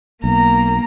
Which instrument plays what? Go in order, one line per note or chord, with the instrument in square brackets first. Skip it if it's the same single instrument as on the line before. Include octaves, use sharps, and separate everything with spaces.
[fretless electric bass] B1 [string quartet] A#3 A#5